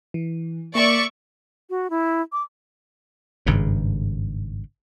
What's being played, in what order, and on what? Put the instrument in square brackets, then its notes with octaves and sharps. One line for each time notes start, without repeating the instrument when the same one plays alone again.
[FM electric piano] E3
[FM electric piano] A#3 [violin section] D5 E5 C#6
[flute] F#4
E4
D6
[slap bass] G#1 G2 C#3